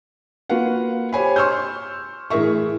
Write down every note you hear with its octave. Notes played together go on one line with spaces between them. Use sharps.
A#3 F4 F#4 B4 F5 F#5
G4 C5 C#5 G#5 B5
C6 C#6 E6 F6 G6
A2 E3 G#4 A#4 E5 C#6